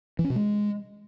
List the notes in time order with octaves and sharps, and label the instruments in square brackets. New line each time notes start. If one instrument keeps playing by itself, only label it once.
[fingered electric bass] E3
C#4
B2
G#3